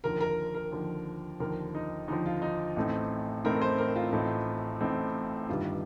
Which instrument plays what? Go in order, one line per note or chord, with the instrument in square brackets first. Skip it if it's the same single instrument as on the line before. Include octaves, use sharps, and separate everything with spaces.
[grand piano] D#2 D3 F3 [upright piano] A#4
[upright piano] A#4
A#4
[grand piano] D#2 D3 F3
[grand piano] D#2 D3 F3 [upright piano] A#4
[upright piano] D#4
[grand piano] D#2 D3 F3 [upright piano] D#4
[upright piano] F4
D#4
[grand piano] A1 A2 A3 C4 D#4
[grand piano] A1 A2 A3 C4 D#4 [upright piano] A#4
[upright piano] C5
A#4
F4
[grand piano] A1 A2 A3 C4 D#4
A1 A2 A3 C4 D#4
[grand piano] G1 G2 D#3 G3 [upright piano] F4